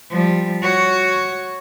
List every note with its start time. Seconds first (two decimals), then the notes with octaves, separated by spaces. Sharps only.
0.10 F3 G3
0.62 F#4 C#5